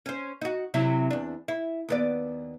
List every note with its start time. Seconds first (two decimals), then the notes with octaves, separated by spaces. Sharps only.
0.06 C#4 C5
0.41 D#4 F#4
0.74 C3 F#3 E4
1.11 E2 D4
1.48 E4
1.89 D#2 B3 D5